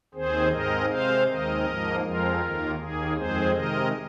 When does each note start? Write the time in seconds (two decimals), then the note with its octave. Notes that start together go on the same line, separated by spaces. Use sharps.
0.14 D#2 D#3 C4 G#4 C5
0.51 G#2 G#3 C4 A#4 D#5
0.90 C3 G#3 C4 C5 F5
1.27 D#2 D#3 G#3 C4 A#4 D#5
1.65 G#2 F3 A#3
2.03 F2 F3 G#3 C4 F4 A#4
2.41 D#2 D#3 A#3
2.79 D#2 D#3 A#3 G#4
3.16 F2 D#3 G#3 C4 G#4 C5
3.54 C3 D#3 G#3 A#4 D#5